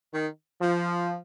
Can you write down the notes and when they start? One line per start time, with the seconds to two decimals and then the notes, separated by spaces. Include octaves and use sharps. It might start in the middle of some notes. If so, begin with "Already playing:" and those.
0.13 D#3
0.61 F3